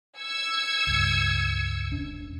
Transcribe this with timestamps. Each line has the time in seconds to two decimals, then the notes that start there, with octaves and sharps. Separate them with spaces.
0.19 E6 G#6 C#7
0.87 C#2 G2
1.91 E1 C#4 D4